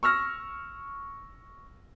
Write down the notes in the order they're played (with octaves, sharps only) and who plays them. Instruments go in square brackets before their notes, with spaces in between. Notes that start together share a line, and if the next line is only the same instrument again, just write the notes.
[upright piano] C#6 E6 F6 A#6